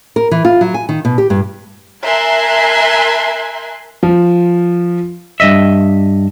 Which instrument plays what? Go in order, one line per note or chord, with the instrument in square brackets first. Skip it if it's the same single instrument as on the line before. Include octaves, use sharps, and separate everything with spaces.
[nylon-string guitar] A#4
E3
F4
F#3
G#5
D#3
B2
G4
G2
[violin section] A#4 E5 G#5 A5 C6 F#6
[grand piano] F3
[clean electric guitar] G2 D#3 D#5 E5